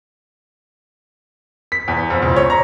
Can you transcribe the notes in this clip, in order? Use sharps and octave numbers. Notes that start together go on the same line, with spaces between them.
B6
E2
F2
C#2
C#5
A#5